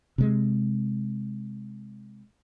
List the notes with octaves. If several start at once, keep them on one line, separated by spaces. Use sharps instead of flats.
C3 G#3